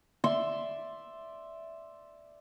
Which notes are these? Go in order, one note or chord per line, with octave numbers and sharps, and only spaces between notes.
D5 E5 C6 E6